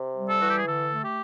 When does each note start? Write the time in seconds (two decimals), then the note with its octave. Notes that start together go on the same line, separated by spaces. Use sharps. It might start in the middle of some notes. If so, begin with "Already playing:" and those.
Already playing: C3
0.16 G3
0.28 A4
0.41 E3 F#4
0.50 G4
0.57 G#4
0.66 D3 A4
0.90 A3
1.03 G4